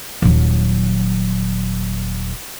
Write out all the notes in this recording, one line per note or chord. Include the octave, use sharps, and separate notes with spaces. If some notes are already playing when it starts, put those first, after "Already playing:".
D#1 F#3